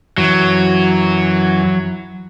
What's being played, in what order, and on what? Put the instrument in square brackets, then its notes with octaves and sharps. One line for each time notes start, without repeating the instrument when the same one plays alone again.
[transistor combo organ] F#2 E3 [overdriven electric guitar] F#3